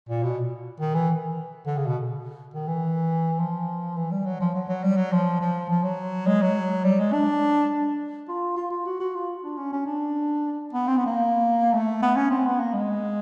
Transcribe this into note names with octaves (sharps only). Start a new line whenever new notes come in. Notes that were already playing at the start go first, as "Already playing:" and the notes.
A#2
B2
D#3
E3
D3
C#3
B2
D#3
E3
F3
E3
G3
F#3
F3
F#3
F#3
G3
F#3
F3
F3
F3
F#3
G#3
F#3
G3
G#3
D4
F4
F4
F4
F#4
F#4
F4
D4
C#4
C#4
D4
B3
C4
B3
A#3
A3
B3
C#4
C4
B3
A#3
G#3